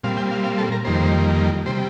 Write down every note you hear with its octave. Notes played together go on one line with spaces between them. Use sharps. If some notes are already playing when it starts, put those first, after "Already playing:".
A#2 G3 C4 F5
G5
F5
F5
A4
A#4
F2 D#3 G3 A#3 C5
C3 G3 C5